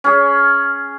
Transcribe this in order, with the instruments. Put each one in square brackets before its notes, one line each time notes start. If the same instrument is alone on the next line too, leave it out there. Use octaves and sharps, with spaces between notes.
[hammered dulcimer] C#4 G#4